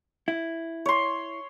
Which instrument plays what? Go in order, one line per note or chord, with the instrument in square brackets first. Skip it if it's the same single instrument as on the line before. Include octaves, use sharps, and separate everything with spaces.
[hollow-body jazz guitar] E4
[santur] C#5 C6